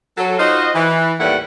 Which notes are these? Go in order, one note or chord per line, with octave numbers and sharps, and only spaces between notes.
F#3 A4
D#4 F4 F#4 C5 D#5
E3
D#2 A2 G3 E4 B4 F#5